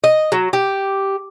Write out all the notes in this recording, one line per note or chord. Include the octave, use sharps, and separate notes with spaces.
D#5
F#3
G4